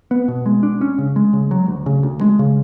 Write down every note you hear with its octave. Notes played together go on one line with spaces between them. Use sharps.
B3
B2
G#3
D4
C#4
C#3
G#3
C#3
F#3
D2
C#3
D2
G#3
C#3